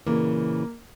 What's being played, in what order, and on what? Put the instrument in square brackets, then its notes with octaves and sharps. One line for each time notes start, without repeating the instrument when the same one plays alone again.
[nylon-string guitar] A#2 C#3 E3 [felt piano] A#3